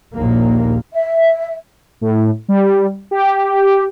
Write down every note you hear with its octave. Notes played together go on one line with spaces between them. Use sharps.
A#1 D#2 A#3
E5
A2
G3
G4